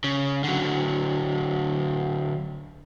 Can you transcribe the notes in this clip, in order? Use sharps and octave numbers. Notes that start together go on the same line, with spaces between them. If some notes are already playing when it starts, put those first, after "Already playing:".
C#3
D3 F#3